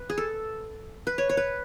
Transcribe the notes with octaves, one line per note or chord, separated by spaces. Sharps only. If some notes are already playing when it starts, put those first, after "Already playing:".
Already playing: B4
G#4
A4
B4
C#5
C#5
B4